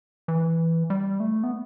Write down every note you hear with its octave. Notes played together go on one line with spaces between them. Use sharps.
E3
G3
A3
B3